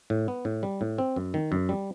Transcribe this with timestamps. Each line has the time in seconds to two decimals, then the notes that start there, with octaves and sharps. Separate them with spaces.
0.10 A2
0.28 B3
0.45 A2
0.63 G3
0.81 A2
0.98 C4
1.16 F#2
1.34 D#3
1.52 F#2
1.69 G3